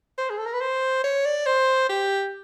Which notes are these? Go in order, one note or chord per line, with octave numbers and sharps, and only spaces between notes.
C5
G#4
A4
A#4
B4
C5
C#5
D5
C5
G4